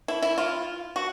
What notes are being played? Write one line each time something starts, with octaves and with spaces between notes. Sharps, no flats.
E4
E4
F4
F#4